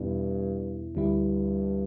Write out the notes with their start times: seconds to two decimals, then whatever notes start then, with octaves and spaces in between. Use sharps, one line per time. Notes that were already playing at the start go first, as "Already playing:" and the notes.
Already playing: E2 G2 B2 B3 E4
0.95 D2 G2 D3 G3 E4